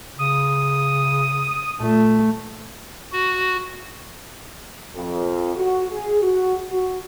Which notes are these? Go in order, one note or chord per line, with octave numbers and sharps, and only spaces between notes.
C#3 D#6
A#2 A3
F#4
F2
F#4
G#4
F#4
F#4